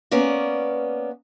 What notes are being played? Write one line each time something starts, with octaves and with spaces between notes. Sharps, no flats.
A#3 B3 C#4 D5